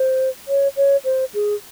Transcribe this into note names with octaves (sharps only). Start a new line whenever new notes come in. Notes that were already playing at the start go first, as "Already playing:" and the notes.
Already playing: C5
C#5
C#5
C5
G#4